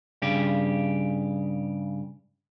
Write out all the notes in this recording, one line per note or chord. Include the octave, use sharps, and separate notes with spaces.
G2 C#3 G4